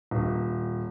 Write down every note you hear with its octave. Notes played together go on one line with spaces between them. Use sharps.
D#1